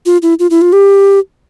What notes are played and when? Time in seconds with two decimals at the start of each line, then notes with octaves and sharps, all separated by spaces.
0.06 F4
0.22 E4
0.39 F4
0.50 E4
0.61 F4
0.73 G4